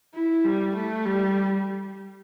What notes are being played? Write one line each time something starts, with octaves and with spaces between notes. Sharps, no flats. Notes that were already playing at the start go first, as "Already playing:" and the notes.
E4
G3
A3
G3